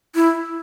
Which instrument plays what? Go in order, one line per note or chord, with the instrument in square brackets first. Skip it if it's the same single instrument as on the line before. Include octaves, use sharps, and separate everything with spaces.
[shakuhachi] E4